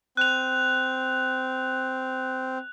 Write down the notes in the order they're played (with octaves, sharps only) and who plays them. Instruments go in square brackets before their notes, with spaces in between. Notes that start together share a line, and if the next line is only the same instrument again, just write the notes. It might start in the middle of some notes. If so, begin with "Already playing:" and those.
[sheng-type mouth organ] C4 [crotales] F#6 F7